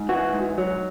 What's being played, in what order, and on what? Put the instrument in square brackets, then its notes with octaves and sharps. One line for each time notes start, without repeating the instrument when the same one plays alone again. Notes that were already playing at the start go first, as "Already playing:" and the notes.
Already playing: [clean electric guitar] G#2
E3 F#4
G#2
F#3